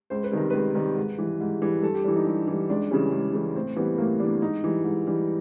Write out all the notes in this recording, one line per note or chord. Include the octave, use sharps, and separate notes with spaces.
C#2 C5
B4
C3 D#3 G3 A#4
C#2 B4
C3 D#3 G3
G#2
E3 G3
G#2
E3 G3
G2 A4
G4
E3 G3 D4
D#4
G2
E3 G3
C#2 D4
C#3 E3 G3 C#4
C#2
C#3 E3 G3
A2 C4
E3 G3 B3
A2 A#3
E3 G3 D4
G#2 D#4
E3 G3
G#2
E3 G3